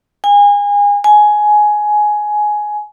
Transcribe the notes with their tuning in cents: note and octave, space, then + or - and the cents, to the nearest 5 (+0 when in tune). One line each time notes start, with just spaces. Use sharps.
G#5 -30
G#5 +15